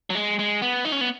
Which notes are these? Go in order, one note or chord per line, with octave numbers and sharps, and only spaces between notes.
F#3
G#3
G#3
B3
D#4
C#4
B3